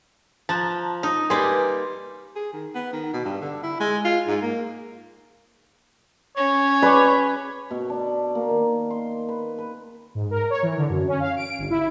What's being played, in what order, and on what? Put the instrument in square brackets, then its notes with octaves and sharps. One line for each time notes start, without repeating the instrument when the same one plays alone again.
[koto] F3 [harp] A5 A#5 F#6
[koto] D#4
[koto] G3 A#3 [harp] B4 G#5 C6
[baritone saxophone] G#4
D#3
B3
D#3
B2
G2
D3
E4
G#3
F4
G#2
A#3
[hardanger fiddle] C#4 [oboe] C#5
[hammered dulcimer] B4 [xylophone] D5 G#5 D6
[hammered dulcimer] B2
D4
A#3
D#3
C6
B4
B4
[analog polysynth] G#2
A#4
C#5
E3
D3
F#2
C#4
F5
D7
G1
E4